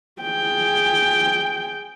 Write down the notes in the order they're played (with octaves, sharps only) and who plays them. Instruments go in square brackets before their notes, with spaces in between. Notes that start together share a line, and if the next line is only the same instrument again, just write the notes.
[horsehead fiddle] G#4 G5